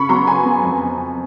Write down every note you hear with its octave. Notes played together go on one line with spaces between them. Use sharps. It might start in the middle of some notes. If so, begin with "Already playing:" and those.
Already playing: C#3 B5 C#6
F#3 B3 A#5 C6
C#3 G#5 A#5
F#3 B3
F2